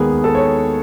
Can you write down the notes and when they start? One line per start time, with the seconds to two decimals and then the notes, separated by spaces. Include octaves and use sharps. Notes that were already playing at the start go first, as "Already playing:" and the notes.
Already playing: D#2 D#3 G#3 B3 G#4
0.24 A4
0.35 C#5